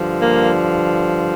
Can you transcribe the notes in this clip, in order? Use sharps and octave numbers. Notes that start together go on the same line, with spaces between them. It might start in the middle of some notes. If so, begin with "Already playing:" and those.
Already playing: G2 D3 F3
A#3